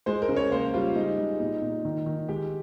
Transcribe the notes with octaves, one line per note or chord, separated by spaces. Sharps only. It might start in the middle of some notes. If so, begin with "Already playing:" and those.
G#3 C5
A#4
C#3
C#5
A#3 C5
G3 F4
G#3 D#4
G#3
A#2 D#4
A#2
D#3
D#3
G#3 G4